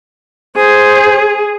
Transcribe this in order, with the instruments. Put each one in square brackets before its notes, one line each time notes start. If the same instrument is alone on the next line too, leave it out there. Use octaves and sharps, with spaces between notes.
[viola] G#4 [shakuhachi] C5